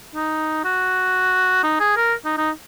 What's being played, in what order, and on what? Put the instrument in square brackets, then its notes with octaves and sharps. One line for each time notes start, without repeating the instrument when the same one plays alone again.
[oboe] D#4
F#4
D#4
G#4
A#4
D#4
D#4